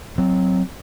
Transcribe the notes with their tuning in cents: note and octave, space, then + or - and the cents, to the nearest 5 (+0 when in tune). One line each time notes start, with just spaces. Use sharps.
F#3 +0 C4 +0